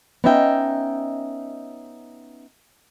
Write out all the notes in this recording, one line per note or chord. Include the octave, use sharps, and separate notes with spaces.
B3 C#4 D#4 D#5 E5 G5